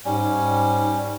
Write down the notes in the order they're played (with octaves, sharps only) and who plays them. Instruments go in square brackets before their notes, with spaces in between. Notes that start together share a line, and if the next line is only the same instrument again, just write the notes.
[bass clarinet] G#2 [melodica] G3 C#4